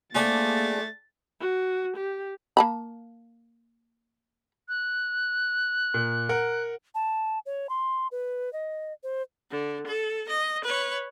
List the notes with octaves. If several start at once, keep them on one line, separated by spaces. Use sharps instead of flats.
A3 A#3 C4 D4 G#4 A6
F#4
G4
A#3 A5 B5
F#6
A#2
A#4 F#5
A5
C#5
C6
B4
D#5
C5
D3
A4
D#5
B4 C#5